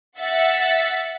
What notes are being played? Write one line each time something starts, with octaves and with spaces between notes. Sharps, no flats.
E5 F#5 A6 B6